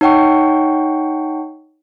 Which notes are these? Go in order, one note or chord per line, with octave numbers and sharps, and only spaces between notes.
D#4 C#5 F#5 G5 C#6